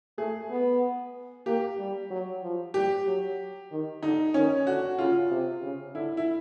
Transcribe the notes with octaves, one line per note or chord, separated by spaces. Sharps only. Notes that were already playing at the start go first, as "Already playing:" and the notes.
A3 G#4
B3
A#3 G4
G3
F#3
F3
G3 G4
F#3
D#3
D3 D#4
D#3 C#4
D3 F#4
C#3 F4
C3
C#3
D3 E4
E4